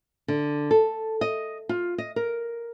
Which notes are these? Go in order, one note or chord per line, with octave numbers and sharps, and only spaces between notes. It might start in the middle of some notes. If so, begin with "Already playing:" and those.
D3
A4
D#5
F4
D#5
A#4